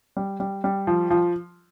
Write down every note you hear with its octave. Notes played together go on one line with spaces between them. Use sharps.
G3
G3
G3
F3
F3